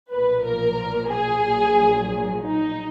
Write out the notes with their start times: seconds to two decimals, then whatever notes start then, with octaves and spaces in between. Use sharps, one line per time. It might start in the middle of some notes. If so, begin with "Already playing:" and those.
0.11 B1 A#2 F3 A#3 B4
0.45 A#4
1.10 G#4
1.43 A#1 A#2 F#3
2.42 D#4